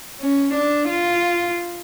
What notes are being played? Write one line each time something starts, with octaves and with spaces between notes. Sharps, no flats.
C#4
D4
F4